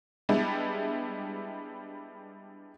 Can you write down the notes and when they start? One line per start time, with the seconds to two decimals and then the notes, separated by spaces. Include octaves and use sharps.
0.29 G3 G#3 B3 D4 E4